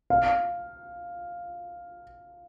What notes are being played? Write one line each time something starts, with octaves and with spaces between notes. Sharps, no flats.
F5